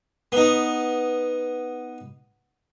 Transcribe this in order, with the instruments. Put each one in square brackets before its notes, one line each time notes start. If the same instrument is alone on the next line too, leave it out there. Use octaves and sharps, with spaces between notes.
[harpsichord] B3 D#4